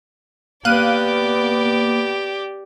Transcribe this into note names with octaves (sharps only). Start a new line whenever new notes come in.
A#3 B3 G4 D5 F5 F#6 D#7